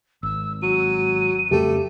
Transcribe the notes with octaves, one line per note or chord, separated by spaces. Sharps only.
G#1 E6
F#3 D#7
F2 C#3 G3 A3 G4